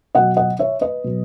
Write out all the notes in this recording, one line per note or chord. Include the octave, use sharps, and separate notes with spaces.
B2 F#3 D#5 F#5
D#5 F#5
C#5 E5
B4 D#5
B2 F#3